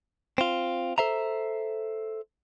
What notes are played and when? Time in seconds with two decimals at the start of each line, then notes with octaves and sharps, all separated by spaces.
0.38 C4 F4
0.98 A4 C5 E5 A#5